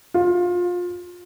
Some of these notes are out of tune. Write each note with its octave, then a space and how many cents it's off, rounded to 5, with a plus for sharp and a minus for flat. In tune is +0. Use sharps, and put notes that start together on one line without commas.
F4 +25